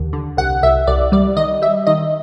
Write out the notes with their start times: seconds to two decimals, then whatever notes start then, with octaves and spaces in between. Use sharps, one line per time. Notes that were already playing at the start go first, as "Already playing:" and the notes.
Already playing: D#2 D3
0.13 D3
0.37 C2 F#5
0.63 C2 E5
0.87 C2 D5
1.12 G3 D5
1.37 D#3 D#5
1.62 G3 E5
1.87 D#3 D#5